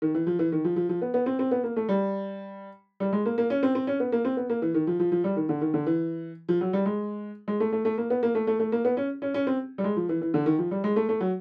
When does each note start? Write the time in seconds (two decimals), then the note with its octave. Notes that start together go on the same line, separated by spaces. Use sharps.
0.02 D#3
0.15 E3
0.27 F3
0.39 E3
0.52 D#3
0.64 F3
0.76 F3
0.89 F3
1.02 B3
1.14 B3
1.26 C4
1.39 C4
1.51 B3
1.64 A#3
1.76 A3
1.89 G3
3.00 G3
3.13 G#3
3.26 A#3
3.38 A#3
3.50 C#4
3.63 C4
3.75 C4
3.87 C#4
4.00 B3
4.12 A#3
4.25 C4
4.37 B3
4.50 A#3
4.62 E3
4.74 D#3
4.87 F3
5.00 F3
5.12 F3
5.24 G3
5.36 D#3
5.49 D3
5.61 D#3
5.74 D3
5.87 E3
6.49 F3
6.61 F#3
6.73 G3
6.86 G#3
7.48 G#3
7.60 A3
7.72 A3
7.85 A3
7.98 A#3
8.10 B3
8.23 A#3
8.35 A3
8.47 A3
8.59 A3
8.72 A#3
8.85 B3
8.97 C#4
9.22 C#4
9.34 C#4
9.47 C4
9.78 G3
9.84 G#3
9.96 F3
10.09 E3
10.21 E3
10.34 D3
10.46 D#3
10.59 F3
10.71 G3
10.84 G#3
10.96 A3
11.09 A3
11.21 F#3